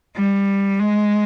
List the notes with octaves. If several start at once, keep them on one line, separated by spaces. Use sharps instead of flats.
G3
G#3